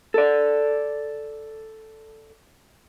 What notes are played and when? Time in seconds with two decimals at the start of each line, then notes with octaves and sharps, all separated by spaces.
0.14 A4 D5